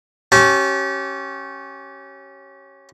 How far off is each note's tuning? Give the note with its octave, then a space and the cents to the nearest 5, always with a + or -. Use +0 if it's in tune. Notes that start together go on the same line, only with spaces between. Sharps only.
C#4 -15 G4 -30 A5 -25